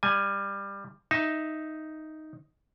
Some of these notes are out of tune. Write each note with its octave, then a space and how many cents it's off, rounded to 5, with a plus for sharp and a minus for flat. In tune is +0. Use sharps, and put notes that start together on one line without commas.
G3 +20 G#5 +0
D#4 +0 E5 +0